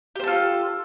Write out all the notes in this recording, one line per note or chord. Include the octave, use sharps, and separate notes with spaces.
F4 G4 A4 C5